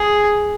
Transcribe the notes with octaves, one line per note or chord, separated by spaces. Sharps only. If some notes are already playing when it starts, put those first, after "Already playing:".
Already playing: G#4